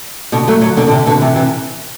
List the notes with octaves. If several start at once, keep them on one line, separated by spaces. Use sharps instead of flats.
B2 D3
F#3 A3
D3 F#3
B2 D3
D3
C3
B2 D3
C3 E3
C3 E3